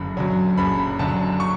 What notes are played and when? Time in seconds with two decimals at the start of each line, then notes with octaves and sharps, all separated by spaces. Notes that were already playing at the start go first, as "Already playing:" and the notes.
Already playing: F#1 F#2 D3 B5
0.17 F#2 D3 F#3
0.57 F#1 B5
0.99 F#2 D3 F#3 A5
1.40 C#6